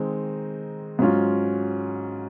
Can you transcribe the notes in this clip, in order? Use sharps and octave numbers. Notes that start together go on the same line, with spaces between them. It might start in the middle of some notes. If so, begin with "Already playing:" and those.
Already playing: D#3 G#3 C4 D#4
G#2 F#3 C#4 F4